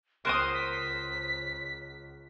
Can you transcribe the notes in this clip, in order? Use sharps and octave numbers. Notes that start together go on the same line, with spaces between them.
C#2 A#4 C5 C6 D#6 F6 F#6
B6